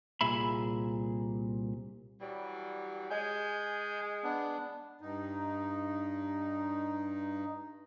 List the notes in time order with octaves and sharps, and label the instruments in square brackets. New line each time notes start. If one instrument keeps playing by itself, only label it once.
[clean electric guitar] C2 A#2 G#4 E5 B5
[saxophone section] E3 F#3 G3
[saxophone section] G#3 [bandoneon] G#5 G6
[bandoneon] B3 D4
[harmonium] G2 D#4